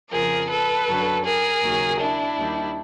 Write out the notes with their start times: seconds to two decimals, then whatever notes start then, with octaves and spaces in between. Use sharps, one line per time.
0.12 F2 C#3 F3 G#4 A#4
0.49 A4 B4
0.86 F#2 D3 F#3
1.24 G#4 A#4
1.62 D#2 C#3 F#3
2.00 D4 E4
2.37 D#2 D#3 G3